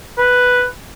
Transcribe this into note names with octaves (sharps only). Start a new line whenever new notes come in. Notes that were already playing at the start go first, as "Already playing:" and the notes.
B4